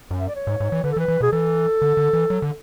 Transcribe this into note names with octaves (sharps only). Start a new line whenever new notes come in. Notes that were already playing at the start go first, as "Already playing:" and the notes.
F#2
E5
D5
C#5
G#2
G#2
E3
D3 B4
A4
E3
B4
E3
B2 G#4
E3 A4
D3
D3
E3
F#3
D3